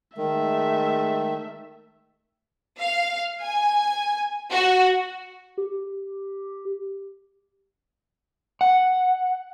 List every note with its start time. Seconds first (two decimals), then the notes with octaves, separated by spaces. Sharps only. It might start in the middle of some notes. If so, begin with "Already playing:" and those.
0.17 D#3 G#3 A3 E5
2.80 F5
3.42 G#5
4.51 F#4
5.58 G4
8.61 F#5